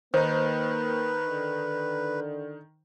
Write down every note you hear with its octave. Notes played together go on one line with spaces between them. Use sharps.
D#3 A#3 D#4 B4 C5
D3